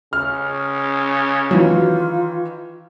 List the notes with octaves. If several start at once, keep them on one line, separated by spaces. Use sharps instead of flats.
C#3 F6
D#3 E3 F#3 F4